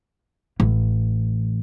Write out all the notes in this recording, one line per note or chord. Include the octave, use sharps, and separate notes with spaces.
A1